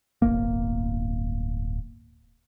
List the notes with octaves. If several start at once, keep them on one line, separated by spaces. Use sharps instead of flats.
D1 G1 A#3